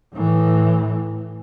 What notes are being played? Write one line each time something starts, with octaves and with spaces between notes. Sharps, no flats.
A2 E3